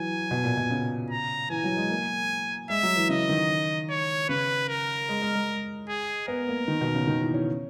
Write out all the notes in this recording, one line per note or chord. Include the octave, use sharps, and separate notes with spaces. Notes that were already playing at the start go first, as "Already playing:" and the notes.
Already playing: E3 F#3 G#5
B2
A#2
B2
C#3
A#5
E3 G#5
F#3
G#3
A#3
G#3 E5
F#3
E3
C#3 D#5
D#3
C#5
C#3 B4
A#4
G#3
G#3
G#3
G#4
B3 A#4
A#3
D#3
B2
C#3
D#3
E3
C#4